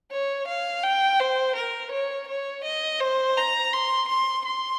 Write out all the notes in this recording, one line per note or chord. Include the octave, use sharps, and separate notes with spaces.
C#5
F5
G5
C5
A#4
C#5
C#5
D#5
C5
A#5
C6
C6
C6